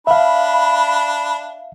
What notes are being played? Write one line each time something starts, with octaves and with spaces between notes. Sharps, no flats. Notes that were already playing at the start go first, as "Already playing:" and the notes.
D4 E5 F5 B5